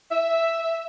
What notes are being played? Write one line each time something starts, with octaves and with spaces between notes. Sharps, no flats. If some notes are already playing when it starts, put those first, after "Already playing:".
E5